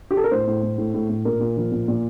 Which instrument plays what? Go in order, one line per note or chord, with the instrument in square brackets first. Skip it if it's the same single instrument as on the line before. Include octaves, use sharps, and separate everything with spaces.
[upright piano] G4
A4
A#4
A2 C5
A2
A2
A2
A2
A2
A#2 A#4
A#2
F3
A#2
A#2